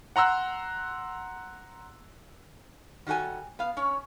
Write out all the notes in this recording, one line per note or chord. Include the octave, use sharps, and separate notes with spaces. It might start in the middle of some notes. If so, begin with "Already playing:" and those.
F#5 A#5 C6 E6 F#6
D#3 G3 F#4 A4 G#5
B3 F5
C#4 C#5